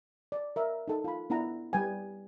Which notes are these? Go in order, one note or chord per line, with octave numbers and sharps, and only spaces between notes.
D5
A#4 E5
D#4 A4
F4 B5
B3 D4 E4 F#5 A#5
G3 B4 G5 G#5